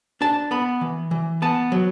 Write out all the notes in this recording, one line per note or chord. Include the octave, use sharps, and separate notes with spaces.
D4 A5
B3 B5
E3
E3
B3 A5
F#3